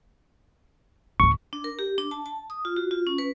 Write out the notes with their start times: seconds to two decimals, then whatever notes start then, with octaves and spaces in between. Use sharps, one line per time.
1.20 D2 A2 C#6
1.53 D4
1.64 A#4
1.79 G4
1.98 D4
2.11 A5
2.26 A5
2.50 D#6
2.65 F4
2.77 F#4
2.91 F4
3.07 C#4
3.18 B4